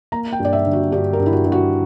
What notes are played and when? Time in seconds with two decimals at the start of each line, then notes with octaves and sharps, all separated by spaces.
0.12 A#3 A#5
0.33 G5
0.39 G2
0.45 D5
0.53 E5
0.67 D3
0.73 F#4
0.92 G2 G4
1.13 A#4
1.19 G2
1.26 E4
1.33 F#4
1.45 G2
1.52 F#4